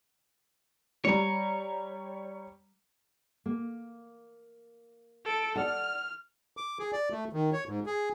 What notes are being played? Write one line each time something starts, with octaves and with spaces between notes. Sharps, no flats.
G3 C#5 A#5
A#3
A4 D7
D5 F#5 F6
D6
G#4
D5
A3
D#3
C#5
G#2
G#4